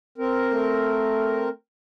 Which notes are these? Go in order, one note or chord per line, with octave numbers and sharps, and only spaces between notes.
C4 A#4
A3